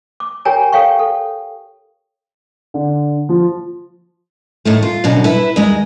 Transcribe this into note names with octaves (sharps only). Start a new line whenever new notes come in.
D6
G4 A#4 C#5 G5 G#5 A#5
A4 C#5 F5 G5 C#6
A4
D3
F3
D#2 A2 A3
F4
F#2 B2 D3
E4 B4 E5
D#2 G#3 D#5